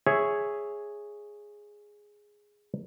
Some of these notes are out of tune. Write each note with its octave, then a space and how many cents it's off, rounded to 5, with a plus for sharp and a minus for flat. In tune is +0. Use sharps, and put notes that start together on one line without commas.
G#4 +0 C#5 +0 E5 +0